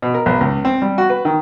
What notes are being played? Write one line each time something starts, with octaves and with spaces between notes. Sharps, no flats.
B2
A#4
B1
C#2
C4
G3
F#4
B4
D#3